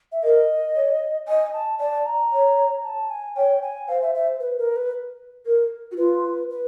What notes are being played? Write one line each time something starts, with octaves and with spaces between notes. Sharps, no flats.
E5
A#4 D#5
C#5
D#5 G#5
A5
D5 A5
A#5
C#5
A5
G#5
C#5 G5
G#5
C5 F5
E5
E5
B4
A#4
B4
A#4
F#4
F4 B4
B4